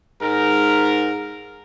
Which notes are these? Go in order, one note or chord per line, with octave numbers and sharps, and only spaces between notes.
G#2 A#4